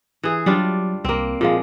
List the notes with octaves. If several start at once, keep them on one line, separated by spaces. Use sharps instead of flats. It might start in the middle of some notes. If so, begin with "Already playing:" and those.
E3 G#4
F#3 G3 D4 F4
C2 A#3 C4
A#2 F3 G#3 F4 G#4 F5